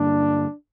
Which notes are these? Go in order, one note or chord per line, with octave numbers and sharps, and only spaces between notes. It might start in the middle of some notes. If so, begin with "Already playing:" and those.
Already playing: G2 D3 G3 A#3 D4